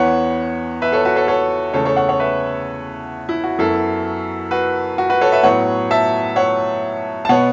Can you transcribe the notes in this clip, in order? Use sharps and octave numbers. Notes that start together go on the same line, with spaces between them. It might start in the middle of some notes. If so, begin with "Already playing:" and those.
Already playing: E2 E3 B3 C#5 F#5
B4 E5
A4 C#5
F#4 B4
A4 C#5
A4 C#5
E2 C#3 A3 A4 C#5
A4 C#5
C#5 F#5
C#5 F#5
B4 E5
E4
F#4
F#2 F#3 B3 E4 A4
F#4 B4
F#4
F#4 B4
A4 C#5
B4 E5
A2 F#3 B3 C#5 F#5
E5 A5
C#5 F#5
A5
B2 B3 C#5 F#5